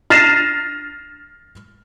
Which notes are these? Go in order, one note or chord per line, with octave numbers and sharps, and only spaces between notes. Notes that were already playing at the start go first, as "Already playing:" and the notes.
F6 A6 A#6 C7 D#7 E7